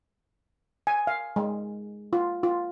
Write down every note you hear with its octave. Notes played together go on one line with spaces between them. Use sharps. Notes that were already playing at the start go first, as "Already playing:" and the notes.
G#5
F5
G#3
F4
F4